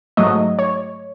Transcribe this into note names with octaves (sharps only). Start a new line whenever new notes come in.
G#2 F#3 A3 D#5
C#5